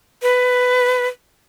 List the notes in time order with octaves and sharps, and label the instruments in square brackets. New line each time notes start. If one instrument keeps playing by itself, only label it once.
[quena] B4